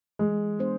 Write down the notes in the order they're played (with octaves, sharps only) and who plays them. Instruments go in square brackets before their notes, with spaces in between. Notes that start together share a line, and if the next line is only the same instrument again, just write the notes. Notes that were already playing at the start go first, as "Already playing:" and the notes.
[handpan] E3 [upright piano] G#3
[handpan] B3 D4 G#4 C5